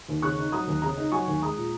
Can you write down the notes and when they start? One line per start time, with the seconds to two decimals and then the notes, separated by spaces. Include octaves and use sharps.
0.08 D#2
0.22 C#3 C#6 F#6
0.38 D#4
0.52 F#3 A#5 D#6
0.67 D#2
0.82 C#3 A#5 D#6
0.97 D#4
1.12 F#3 G#5 C#6
1.27 D#2
1.42 G#3 A#5 D#6
1.57 A#2